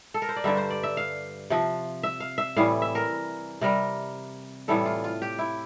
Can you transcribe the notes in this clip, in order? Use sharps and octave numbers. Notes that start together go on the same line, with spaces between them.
A4
A#4
C5
D5
G2 D3 G3 E5
C5
D5
E5
F5
C3 F3
E5
F5
E5
A2 E3 G3 F5
E5
A#4
C3 G3 A#4
A2 E3 G3 A4
F4
F4
G4
E4